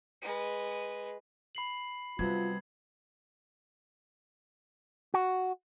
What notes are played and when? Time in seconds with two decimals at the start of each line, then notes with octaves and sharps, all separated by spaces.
0.22 G#3 B4
1.55 B5 C7 F#7
2.19 C3 F#3 G3 B3 F4 G#6
5.14 F#4